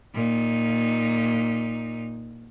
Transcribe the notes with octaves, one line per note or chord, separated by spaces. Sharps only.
A#2 D#4